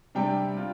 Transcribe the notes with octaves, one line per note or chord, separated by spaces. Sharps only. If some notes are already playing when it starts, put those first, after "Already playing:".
C3 G3 D4 G5
D4 F4